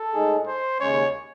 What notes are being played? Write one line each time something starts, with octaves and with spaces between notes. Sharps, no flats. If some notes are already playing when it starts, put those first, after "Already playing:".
Already playing: A4
A2 G#3 D#4 G#4
C5
D#2 C#3 G#3 C#4 C#5